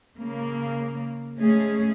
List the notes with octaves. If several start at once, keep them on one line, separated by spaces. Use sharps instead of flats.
C#3 A#3
G#3 A3 C#4 G#4